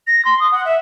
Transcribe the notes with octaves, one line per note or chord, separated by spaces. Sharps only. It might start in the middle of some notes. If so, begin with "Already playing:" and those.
A#6
C6
D#6
F#5
E5